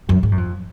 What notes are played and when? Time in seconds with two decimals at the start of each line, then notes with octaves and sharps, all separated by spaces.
0.09 F#2
0.23 G#2
0.32 F#2
0.38 F2